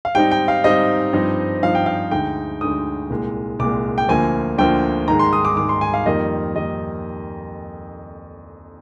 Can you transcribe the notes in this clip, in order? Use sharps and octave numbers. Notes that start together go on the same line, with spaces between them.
F5
G#2 G3 C4 D#4 G5
G5
F5
G#2 G3 C4 D#4 D#5
G2 F3 C4 D#4
G2 F3 C4 D#4 F5
G5
F5
D2 D3 G#3 D#4 G5
D2 D3 G#3 D#4 D#6
C2 A#2 G#3
C2 A#2 G#3 D6
G5
D2 D3 F3 A#3 G#5
D2 D3 F3 A#3 G5
G#2 D#3 G#3 A#5
C6
D#6
D6
G#2 D#3 G#3 D6
C6
G#5
F5
F2 D#3 G3 A#3 D#5
D#3 G3 A#3 D#5